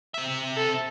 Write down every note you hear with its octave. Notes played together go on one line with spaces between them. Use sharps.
C4 E5
A4